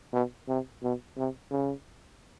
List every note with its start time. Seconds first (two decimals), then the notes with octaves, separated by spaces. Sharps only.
0.13 B2
0.48 C3
0.83 B2
1.17 C3
1.51 C#3